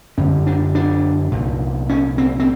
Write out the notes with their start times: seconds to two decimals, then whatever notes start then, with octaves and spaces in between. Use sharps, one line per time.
0.18 F#2 D3 C#4
0.47 D4
0.75 D4
1.32 C2 A#2
1.89 C#4
2.18 C4
2.40 C4